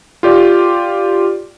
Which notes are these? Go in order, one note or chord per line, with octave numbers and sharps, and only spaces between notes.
F4 G4 D5